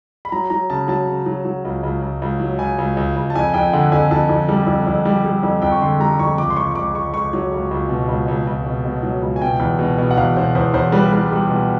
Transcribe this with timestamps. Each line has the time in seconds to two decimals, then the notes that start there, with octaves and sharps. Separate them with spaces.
0.25 B5
0.32 F#3 A#5
0.50 F#3 A#5
0.70 C#3 A5
0.88 F#3 A5
1.07 C#3
1.26 F#3
1.45 F#3
1.65 C#2
1.83 C#2
2.02 C#2
2.22 C#2
2.40 F#3
2.59 C#2 G#5
2.78 C#2
2.97 C#2
3.16 C#2
3.30 A5
3.35 F2 G#5
3.54 F2 G5
3.73 D3 F#5
3.92 F2 G#5
4.11 F2 A5
4.29 F2
4.49 G3
4.67 F2
4.87 F2
5.06 G3
5.25 G3
5.43 F2
5.62 F2 G5
5.72 C#6
5.82 D3 C6
6.00 G3 A#5
6.19 F2 C#6
6.38 C#2 D6
6.50 C6
6.56 C#2 C#6
6.71 C#6
6.75 C#2 D6
6.95 C#2 C#6
7.14 C#2 C#6
7.33 F#3
7.52 C#2
7.71 C#2
7.89 B2
8.08 C#2
8.28 C#2
8.47 C#2
8.66 B2
8.85 B2
9.03 F#3
9.22 C#2
9.36 G#5
9.42 B2 G5
9.60 E2
9.79 B2
9.98 B2
10.11 F#5
10.17 E2 F5
10.36 B2 C5
10.55 E2 C5
10.74 E2 C5
10.92 G3 B4
11.13 G3
11.31 G3
11.50 B2